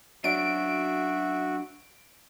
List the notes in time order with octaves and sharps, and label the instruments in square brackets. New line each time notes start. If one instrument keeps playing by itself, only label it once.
[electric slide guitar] F#3 C#4 D4 [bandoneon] F#4 [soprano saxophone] E5 [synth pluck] D7